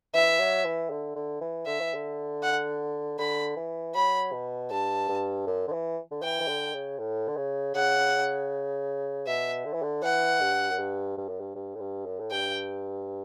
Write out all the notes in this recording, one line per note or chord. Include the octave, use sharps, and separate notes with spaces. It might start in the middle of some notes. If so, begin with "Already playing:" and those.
E3 E5
F#3
E3
D3
D3
E3
D3 E5
E3
D3
F#5
D3 B5
E3
F#3 B5
B2
G2 A5
G2
F#2
D3
E3
D3
E3 G5
E3
D3
C#3
A2
D3
C#3
C#3 F#5
B2 E5
D3
E3
D3
E3 F#5
G2
F#2
G2
G2
F#2
G2
G2
A2
G2
F#2
A2
G2 G5